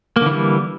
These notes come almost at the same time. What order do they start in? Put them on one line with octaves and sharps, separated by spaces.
A#3 D3 E3 G3